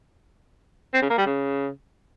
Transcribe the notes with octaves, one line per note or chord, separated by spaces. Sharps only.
C4
C#3
A#3
G3
C#3